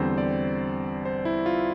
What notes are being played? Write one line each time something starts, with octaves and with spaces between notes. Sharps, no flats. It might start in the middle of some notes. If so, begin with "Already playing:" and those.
Already playing: E2 D3 G3 C4 C5
D5
C5
E4
F4